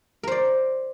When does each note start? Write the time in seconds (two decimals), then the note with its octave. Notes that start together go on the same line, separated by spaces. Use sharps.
0.23 A#4
0.27 C5
0.32 D5